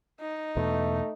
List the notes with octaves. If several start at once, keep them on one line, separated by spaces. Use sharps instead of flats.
D#4
E2 B2 A3